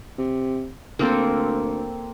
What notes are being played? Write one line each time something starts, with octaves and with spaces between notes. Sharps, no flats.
C3
D2 A#3 C4 A4